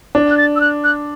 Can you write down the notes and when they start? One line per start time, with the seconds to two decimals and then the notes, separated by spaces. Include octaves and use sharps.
0.15 D4
0.30 F#6
0.37 A6
0.56 E6
0.61 F#6
0.84 F#6